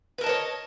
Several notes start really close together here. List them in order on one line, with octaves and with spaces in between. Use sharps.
B4 A#4 A5 D#5 C#5